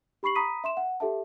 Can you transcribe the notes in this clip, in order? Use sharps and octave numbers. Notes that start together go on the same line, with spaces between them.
G4 B5 C#6 C7 F#7
A#5 B5 D#6 B6 D#7
E5 C6 E7
F#5
G4 A4 E5 A5